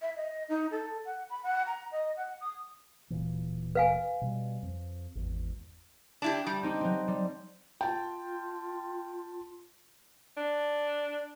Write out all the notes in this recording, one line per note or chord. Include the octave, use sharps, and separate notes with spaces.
E5
D#5
D#4
A4
F#5
B5
F#5
A#5
D#5
F#5
D#6
D1 A#2 E3
B4 F5 G#5
B2 G3
F2
G#1 E2
D4 E4 G4 A5
G3
C4 D#4 G4
F#3 C4
G3
F4 G5 A5
D4